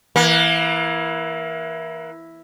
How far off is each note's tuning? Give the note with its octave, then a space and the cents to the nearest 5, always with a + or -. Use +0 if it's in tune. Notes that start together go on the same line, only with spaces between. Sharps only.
E3 +0 A#3 +30